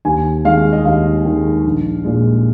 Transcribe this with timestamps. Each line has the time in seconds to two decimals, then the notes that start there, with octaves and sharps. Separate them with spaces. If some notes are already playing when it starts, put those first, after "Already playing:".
0.05 D#2 G#5
0.45 D#3 G#3 F5
0.73 D#5
0.85 D#2 F5
1.25 D#3 G#3
1.65 A#1
2.04 A#2 G#3